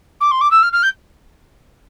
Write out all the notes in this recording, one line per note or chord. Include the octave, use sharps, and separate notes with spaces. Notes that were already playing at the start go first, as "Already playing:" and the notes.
D6
C6
D6
E6
F6
F6
G6